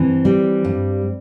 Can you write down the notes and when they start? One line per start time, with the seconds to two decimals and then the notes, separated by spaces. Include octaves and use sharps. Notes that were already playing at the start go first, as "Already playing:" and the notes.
Already playing: G2 E3 C4
0.25 G3
0.65 G2